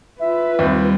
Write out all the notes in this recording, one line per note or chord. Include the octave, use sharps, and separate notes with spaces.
F4 B4 E5
D#2 G3 C4